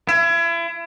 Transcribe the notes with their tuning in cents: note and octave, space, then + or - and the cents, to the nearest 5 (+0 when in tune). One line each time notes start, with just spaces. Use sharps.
E4 +35